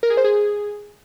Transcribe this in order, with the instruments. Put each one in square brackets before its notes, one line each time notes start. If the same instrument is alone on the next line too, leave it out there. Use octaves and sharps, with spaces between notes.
[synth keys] A#4
G#4
C5
G#4